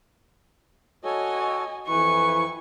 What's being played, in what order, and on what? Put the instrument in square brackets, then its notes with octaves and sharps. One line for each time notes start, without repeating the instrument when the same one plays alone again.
[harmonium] F#4 A4 C#5 [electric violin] D#5 G#5
[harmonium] F2 E3 B4 [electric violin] E4 G#5 [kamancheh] C#6